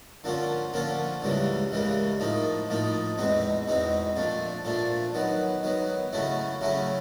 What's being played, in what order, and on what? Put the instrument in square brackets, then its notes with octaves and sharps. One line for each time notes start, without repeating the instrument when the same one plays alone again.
[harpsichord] D3 F3 A#3 C#4 F4
D3 F3 A#3 C#4 F4
C#2 C#3 E3 G3 A#3
C#2 C#3 E3 G3 A#3
A2 F3 A#3 D#4
A2 F3 A#3 D#4
E2 B2 G#3 C4 D#4
E2 B2 G#3 C4 D#4
A#2 F3 A3 D4
A#2 F3 A3 D4
D#3 F#3 B3
D#3 F#3 B3
C#3 F#3 A3 C#4 E4
C#3 F#3 A3 C#4 E4